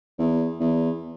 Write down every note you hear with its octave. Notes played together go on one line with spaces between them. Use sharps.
E2
E2